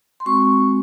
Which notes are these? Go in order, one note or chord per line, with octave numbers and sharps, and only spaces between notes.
C6
G#3 C4 F#4 C#6